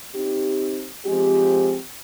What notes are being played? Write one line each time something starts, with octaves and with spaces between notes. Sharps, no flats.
C4 D#4 G4
F3 G#3 C4 G4